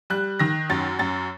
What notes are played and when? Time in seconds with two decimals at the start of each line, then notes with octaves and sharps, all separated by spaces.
0.10 G3 F#6
0.39 D#3 A#6
0.70 F#2 A6
0.99 F#2 A6